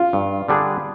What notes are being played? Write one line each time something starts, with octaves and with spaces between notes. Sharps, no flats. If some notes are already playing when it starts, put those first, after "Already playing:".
Already playing: F4
G2
D3 G3 D4 G#4